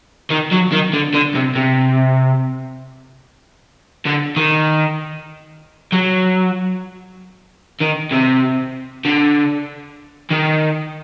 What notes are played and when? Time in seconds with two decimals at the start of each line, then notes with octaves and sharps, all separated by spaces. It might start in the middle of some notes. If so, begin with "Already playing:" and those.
0.30 D#3
0.51 F#3
0.72 D#3
0.93 D3
1.14 D3
1.35 C3
1.55 C3
4.05 D3
4.36 D#3
5.92 F#3
7.80 D#3
8.11 C3
9.05 D3
10.30 D#3